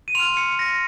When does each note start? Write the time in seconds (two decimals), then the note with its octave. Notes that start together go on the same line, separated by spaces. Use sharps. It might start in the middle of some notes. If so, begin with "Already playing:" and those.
0.08 D#7
0.15 C6 F7
0.20 F6
0.37 C#7
0.59 A#6